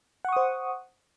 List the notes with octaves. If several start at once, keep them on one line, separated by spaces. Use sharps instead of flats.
C5 F#5 C#6 D#6